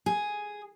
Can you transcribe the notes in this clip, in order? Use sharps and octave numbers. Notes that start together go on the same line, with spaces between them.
G#4